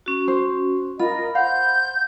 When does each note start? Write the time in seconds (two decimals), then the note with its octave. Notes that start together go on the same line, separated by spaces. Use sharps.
0.06 C#4 F#4
0.28 C5
1.00 F4 A#4 D#5 B5
1.35 C5 F5 F#5 G6